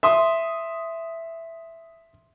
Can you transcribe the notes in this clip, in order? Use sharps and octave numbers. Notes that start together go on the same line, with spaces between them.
E5 C6 D#6